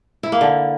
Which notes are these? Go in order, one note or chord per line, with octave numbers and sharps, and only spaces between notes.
E4
A#3
D3